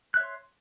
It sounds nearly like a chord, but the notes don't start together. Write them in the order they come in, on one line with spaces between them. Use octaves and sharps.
F#6 E5 C#5 C6